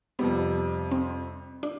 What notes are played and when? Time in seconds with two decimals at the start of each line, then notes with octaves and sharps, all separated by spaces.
0.19 F2 C3 G3 B3
0.91 C4
1.63 D4